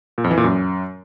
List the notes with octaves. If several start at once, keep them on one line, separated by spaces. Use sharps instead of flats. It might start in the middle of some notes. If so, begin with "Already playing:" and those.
A#2
F2
E3
A#2
F#2